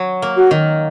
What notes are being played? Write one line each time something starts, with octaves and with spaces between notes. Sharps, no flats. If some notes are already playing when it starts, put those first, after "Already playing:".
Already playing: F#3
A#3
F#4
D#3